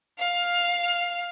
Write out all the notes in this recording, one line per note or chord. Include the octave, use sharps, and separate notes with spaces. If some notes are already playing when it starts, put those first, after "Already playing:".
F5 F6